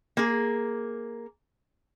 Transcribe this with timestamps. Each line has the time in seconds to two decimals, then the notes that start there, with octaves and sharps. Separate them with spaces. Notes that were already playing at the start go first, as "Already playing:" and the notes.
0.17 A#3 G#4